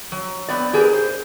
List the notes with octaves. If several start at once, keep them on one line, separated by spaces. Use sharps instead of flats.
F#3
B3 C4 D5
G4 G#4 A#4 B4
C5